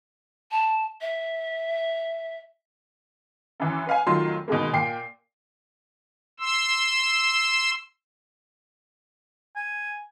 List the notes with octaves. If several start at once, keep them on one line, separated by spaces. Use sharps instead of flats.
A5
E5
F#2 E3
B4 F5 G#5
F1 D#3 F#3 F4 C6
B2 D#3 G#3 A#3
A#2 G5 C7
C6 E6
G#5